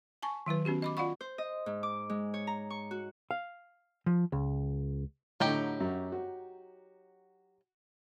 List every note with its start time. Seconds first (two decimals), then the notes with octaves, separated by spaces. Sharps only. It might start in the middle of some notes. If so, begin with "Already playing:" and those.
0.22 G#5 A5 C#6
0.46 D#3 F#3 E4 B4
0.65 B3 C#4 F#4 G4
0.82 D#5 B5 D6
0.97 F4 D5 F5 F#5 B5 C#6
1.21 C5
1.38 D#5
1.66 G#2
1.83 D6
2.10 G#3
2.34 C#5
2.47 A#5
2.70 C#6
2.91 F#4
3.31 F5
4.06 F3
4.32 C#2
5.40 A2 D3 F#3 D#4 G4
5.80 F#2
6.12 F#4